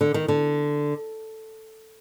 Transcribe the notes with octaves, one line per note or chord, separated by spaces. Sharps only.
D3
D#3
D3